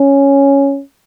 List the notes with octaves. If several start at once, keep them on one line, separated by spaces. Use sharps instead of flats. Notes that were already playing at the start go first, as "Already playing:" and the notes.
Already playing: C#4